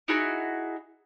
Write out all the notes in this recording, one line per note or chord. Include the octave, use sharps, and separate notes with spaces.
D#4 E4 F#4 G#4